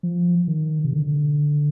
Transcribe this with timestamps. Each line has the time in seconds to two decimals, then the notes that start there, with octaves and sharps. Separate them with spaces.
0.03 F3
0.48 D#3
0.84 C3
0.93 D3